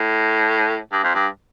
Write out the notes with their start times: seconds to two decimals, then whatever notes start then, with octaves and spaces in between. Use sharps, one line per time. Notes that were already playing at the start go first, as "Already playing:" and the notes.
Already playing: A2
0.92 G2
1.04 F2
1.15 G2